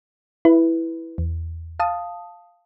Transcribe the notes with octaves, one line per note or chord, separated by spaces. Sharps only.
E4 B4
E2
F5 A5 D#6